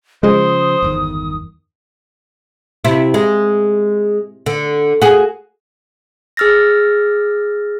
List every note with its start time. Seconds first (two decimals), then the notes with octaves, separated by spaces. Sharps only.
0.23 C#3 F3 G#3 C5 D#6
0.82 G1 E2 D#3
2.85 C3 E4
3.14 G#3
4.46 D3
5.02 F#4 G#4
6.37 G#4 E6 F6 A6 A#6